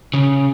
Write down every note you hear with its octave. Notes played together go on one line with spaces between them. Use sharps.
C#3